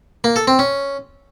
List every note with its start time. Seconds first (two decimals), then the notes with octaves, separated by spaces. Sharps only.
0.24 A#3
0.36 A4
0.47 C4
0.59 C#4